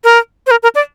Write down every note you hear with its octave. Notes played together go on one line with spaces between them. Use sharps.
A#4
C5
A#4
A#4
D5